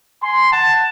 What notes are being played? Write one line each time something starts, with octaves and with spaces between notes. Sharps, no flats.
G#5 C6
F#5 A5